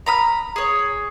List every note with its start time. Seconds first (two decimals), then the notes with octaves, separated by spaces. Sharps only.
0.06 A#5 B5 D#6 F6
0.56 G#4 C#5